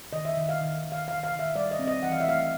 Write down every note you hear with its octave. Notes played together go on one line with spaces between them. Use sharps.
D#3 D#5
E5
D#3
F5
D#3
D#3
F5
D#3 F5
F5
D#3
E5
G3 D5
D#5
C4
D#5
E3 F#5
F5
E5
A3 F5